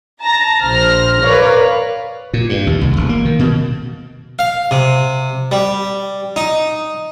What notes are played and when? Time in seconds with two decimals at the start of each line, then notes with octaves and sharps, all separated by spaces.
0.22 A5 A#5 A#6
0.62 A#1 C5 F6 A#6
1.23 A#4 B4 C#5 D5 F5
2.33 A#2
2.49 G2
2.67 D#2
2.81 C2
2.97 E1
3.09 A#3
3.25 D#3
3.39 B2
4.39 F5
4.71 C3
5.52 G3
6.36 D#4